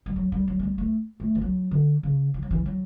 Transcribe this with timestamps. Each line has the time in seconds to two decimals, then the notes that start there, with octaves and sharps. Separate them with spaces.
0.06 G3
0.16 F#3
0.32 G3
0.48 F#3
0.59 A3
0.63 G3
0.78 A3
1.20 A3
1.35 E3
1.41 F#3
1.71 D3
2.03 C#3
2.34 E3
2.43 F#3
2.51 E3
2.66 F#3